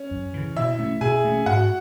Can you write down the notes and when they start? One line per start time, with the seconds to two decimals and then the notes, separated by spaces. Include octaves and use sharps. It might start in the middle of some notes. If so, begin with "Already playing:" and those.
Already playing: C#4
0.11 F#2
0.34 C#3 E3
0.56 B2 E4 E5
0.79 A3 C#4
1.01 B2 G#4 G#5
1.25 A3 C#4
1.46 G#2 F#4 F#5